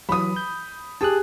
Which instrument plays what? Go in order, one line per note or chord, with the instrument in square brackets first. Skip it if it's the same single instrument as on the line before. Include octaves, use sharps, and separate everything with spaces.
[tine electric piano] E3 F#3 [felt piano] B5 D#6
[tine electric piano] G6
[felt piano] G4 G#4 [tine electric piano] A5 D#6 F#6